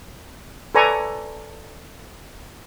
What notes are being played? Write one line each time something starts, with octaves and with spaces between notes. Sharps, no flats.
A4 B4 D5 G#5 A#5 C#6